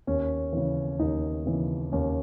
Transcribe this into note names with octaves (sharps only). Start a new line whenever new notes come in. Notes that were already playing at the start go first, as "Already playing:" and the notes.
D#2 C#4
C#3 E3
D#2 D#4
C#3 E3
D#2 C#4